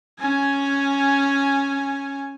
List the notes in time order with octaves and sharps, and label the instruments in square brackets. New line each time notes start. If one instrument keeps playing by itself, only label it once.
[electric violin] C#4 G#5